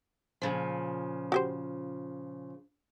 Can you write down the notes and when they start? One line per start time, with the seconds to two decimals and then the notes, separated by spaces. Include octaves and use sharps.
0.42 A#2 C#3 F3
1.32 F#4 G4 C5